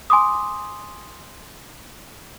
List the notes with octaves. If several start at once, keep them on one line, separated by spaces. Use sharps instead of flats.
G#5 C6 D6 D#6